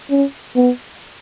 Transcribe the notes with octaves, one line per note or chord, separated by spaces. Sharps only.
C#4
B3